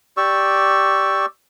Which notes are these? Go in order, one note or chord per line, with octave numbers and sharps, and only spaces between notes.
G4 D5 C#6 E6